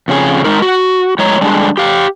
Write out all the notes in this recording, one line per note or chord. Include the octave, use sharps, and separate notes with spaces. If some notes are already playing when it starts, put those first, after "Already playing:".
F2 C#3 G#4
G#3 D#4 A#4
F#4
A2 G#3 C#5 A#5
D3 G3 G#3 D4
G4 F5